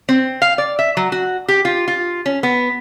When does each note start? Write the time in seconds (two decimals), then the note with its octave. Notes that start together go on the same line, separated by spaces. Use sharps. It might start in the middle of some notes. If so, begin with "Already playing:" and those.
0.09 C4
0.42 F5
0.58 D5
0.79 E5
0.97 F#3
1.12 F#4
1.48 G4
1.65 F4
1.88 F4
2.26 C#4
2.43 B3